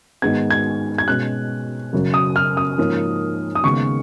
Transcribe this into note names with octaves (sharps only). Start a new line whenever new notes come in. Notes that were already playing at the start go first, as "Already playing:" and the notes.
G#2 D#3 G#3 B3 G#6
G#6
G#6
B2 G#3 C#4 F#6
F#2 C#3 F#3
D#6
F6
D#6
G#2 F3 A#3 C#4
D#6
D#2 C#3 G#3 B3 C#6